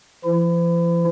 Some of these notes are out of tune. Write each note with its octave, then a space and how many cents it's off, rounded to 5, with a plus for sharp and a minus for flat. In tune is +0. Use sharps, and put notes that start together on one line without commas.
F3 -45 E4 +30